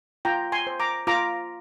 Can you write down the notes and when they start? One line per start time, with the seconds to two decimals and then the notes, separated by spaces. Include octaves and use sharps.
0.25 F4 G5 A#5
0.52 G#5 C6
0.67 C5
0.80 A#5 D6
1.07 F4 A#5 D6